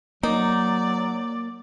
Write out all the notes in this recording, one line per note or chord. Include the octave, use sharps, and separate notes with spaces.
F#3 A#3 D#4 D5